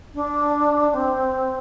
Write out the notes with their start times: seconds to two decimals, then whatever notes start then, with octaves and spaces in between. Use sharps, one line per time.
0.15 D4
0.94 C4